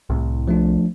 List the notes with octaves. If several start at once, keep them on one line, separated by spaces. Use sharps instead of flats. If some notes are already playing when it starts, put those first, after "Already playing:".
C2 A2 C3
F3 A3 D4